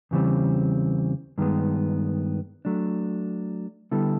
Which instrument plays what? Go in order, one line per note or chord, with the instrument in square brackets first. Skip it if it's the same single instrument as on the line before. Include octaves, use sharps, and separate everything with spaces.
[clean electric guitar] E2 C#3 E3 G3 C4
G2 D#3 G#3 B3
F#3 A3 D4
D3 G3 B3 E4 A4